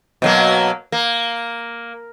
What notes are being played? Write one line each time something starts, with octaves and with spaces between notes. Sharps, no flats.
B2 F#3 A#3
A#3